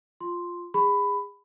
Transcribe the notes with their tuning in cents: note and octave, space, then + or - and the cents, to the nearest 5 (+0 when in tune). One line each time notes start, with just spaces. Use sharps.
F4 +5 C6 +0
G#4 -30 B5 +15